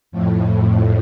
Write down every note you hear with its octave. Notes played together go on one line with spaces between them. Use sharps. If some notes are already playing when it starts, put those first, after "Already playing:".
F2 A2